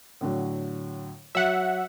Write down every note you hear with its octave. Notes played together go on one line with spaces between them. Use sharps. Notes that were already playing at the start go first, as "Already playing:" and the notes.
A2 D3 F#3
F#3 E5 F#5